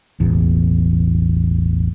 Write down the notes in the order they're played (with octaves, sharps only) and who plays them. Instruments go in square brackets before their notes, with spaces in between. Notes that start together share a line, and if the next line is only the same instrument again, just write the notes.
[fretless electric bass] E1 A1 E2